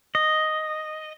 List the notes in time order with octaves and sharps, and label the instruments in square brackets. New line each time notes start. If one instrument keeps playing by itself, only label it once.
[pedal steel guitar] D#5